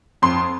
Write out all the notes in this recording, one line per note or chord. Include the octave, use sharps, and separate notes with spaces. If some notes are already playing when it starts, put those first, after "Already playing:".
F2 C6